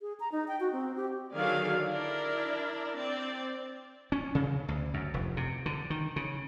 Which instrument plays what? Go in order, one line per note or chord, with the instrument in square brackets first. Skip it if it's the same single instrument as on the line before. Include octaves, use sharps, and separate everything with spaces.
[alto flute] G#4
A#5
D#4
G5
F#4
C4
G4
[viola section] D3 D#3 F#3 G#4 D5 F5
D4 E4 A#4
C4 D5
[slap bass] C#4
C#3
D2
F#2
F1
C3
D3
D#3
C#3